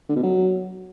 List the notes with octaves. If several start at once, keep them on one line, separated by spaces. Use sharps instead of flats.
D3
B2
F#3